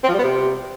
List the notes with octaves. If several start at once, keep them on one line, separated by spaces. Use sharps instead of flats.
C4
F3
G3
B3
C3